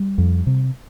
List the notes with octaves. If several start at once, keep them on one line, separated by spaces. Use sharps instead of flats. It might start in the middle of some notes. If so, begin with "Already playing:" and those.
Already playing: G3
F2
C3